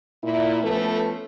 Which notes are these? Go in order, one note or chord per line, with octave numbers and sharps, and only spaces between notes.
A#2 E4
F3 A3 B3 C#4 A4 B4